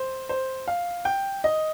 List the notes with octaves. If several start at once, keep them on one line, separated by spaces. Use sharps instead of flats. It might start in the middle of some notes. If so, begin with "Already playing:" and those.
Already playing: C5
C5
F5
G5
D#5